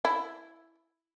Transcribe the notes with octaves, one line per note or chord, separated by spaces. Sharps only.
E4